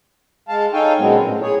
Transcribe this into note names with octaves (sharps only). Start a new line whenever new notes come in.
G#3 F5 A5
D#4 A4 C#5 F5 G5 G#5
A#2 C#3 F#3 G#3 B3 C4
A2
G#4 C#5